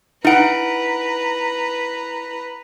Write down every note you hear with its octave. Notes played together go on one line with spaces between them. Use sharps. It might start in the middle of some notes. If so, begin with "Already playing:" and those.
D#4 E4 B4 F#5 A#5 D7